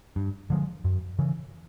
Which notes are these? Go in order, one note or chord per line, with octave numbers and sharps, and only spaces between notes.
G2
D3 F3 G#3
F#2
C#3 E3